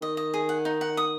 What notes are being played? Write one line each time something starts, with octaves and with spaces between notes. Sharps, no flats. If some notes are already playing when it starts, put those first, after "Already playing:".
D#3 D#5
D#5
G#4
F#5
D#4
F#5
D#6